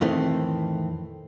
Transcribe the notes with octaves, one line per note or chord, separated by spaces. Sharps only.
F2 A2 D#3 E3 A3 C4